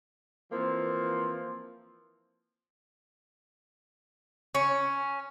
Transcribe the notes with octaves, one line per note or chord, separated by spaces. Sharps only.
E3 F3 A#3 C4
C#4